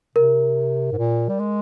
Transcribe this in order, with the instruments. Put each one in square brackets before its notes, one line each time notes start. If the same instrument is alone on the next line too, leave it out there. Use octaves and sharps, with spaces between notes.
[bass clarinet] C3 [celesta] A#4
[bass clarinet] G#2
A#2
G3
G#3